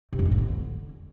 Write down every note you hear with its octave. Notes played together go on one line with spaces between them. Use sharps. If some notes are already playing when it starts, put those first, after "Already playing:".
C3
F2
G#3
F2
D3